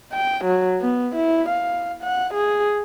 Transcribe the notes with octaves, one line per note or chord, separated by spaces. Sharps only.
G5
F#3
B3
E4
F5
F#5
G#4